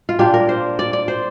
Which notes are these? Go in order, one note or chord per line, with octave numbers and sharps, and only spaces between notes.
F4
A#2 A#3 D4 G4
A#4
C5
D5
D5
C5